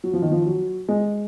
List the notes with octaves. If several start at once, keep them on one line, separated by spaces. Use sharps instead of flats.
F#3
F3
D#3
F3
F#3
G#3